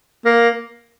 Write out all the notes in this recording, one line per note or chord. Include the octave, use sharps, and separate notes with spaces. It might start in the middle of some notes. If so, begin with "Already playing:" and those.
A#3